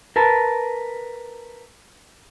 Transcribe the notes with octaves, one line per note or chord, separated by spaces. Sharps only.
A#4 B4 A5